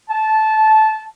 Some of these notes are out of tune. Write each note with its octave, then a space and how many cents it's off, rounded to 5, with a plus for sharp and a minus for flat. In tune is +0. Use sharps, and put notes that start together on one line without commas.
A5 -15